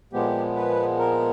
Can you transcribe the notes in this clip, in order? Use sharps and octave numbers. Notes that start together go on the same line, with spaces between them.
A#2 F3 G#3 B3 G4
B4
A#4